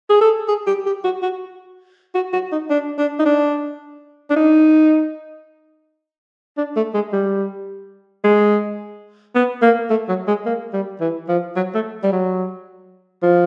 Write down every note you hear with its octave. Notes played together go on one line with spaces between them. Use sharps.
G#4
A4
G#4
G4
G4
F#4
F#4
F#4
F#4
D#4
D4
D4
D#4
D4
D4
D#4
D4
A3
G#3
G3
G#3
B3
A#3
A3
F#3
G#3
A#3
G3
E3
F3
F#3
A3
G3
F#3
F3